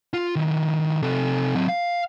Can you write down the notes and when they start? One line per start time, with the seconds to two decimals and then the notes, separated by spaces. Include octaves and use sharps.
0.14 F4
0.36 D#3 E4
1.02 C3 A4
1.55 F#3 C4
1.69 F5